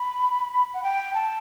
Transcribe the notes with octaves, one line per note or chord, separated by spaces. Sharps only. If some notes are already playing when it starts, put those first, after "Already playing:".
Already playing: B5
F#5
G5
A5